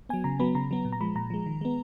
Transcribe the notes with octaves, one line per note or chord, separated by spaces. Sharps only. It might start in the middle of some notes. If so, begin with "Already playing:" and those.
F#3 B3 G#5
C#3 A#5
F#3 B3 B5
C#3 A#5
F#3 B3
A#2
A#5
F3 G#3 B5
A#2 A#5
F3 G#3
D#3
G#3 B3